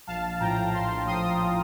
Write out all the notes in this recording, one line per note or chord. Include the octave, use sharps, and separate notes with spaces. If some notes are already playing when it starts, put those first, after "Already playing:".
A#1 F5 A5
A2 F3 G5 A#5
A#1 A5 C6
A2 F3 C6 D#6